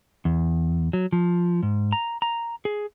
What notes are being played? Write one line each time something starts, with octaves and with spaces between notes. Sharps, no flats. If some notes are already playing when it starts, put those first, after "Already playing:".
E2
F#3
F3
G#2
A#5
A#5
G#4